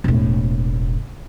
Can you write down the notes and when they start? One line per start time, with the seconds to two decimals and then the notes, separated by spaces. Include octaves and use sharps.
0.04 E1 A2